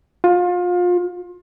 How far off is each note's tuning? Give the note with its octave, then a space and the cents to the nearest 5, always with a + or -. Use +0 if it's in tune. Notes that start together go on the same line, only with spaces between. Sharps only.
F4 +30